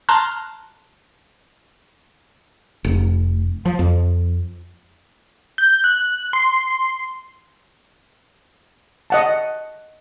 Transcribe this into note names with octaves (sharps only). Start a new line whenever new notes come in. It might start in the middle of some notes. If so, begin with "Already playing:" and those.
A5 A#5 C6 F6 F#6
F1
F3
F2
G6
F#6
C6
D#5 F#5 A5